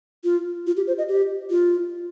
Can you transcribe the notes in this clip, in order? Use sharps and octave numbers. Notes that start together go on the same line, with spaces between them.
F4
F4
G4
C5
D#5
G4
F4